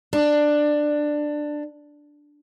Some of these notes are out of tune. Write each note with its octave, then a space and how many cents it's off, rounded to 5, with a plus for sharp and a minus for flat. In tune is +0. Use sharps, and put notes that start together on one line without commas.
D4 +10